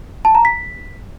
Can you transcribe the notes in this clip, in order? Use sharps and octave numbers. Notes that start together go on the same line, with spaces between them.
A5
A#5
B6